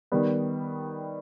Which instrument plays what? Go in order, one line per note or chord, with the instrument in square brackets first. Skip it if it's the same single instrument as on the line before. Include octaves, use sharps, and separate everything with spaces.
[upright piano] D#3 G3 B3